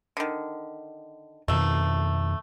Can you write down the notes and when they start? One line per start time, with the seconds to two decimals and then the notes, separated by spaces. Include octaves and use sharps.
0.17 D3 D#3
1.48 F2 B2 D#3 A3 E5